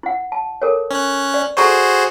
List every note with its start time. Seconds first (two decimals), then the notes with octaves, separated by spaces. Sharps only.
0.03 E4 F#5
0.32 A5
0.62 A4 A#4 C#5
0.91 C#4 F#6
1.34 D5
1.57 F#4 G#4 A4 C5 A#5 C#6